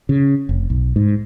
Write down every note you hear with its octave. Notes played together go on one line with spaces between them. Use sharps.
C#3
F1
B1
G#2